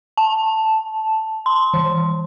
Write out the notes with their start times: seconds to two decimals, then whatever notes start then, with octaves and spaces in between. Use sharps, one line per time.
0.17 A5
1.46 C6
1.74 E3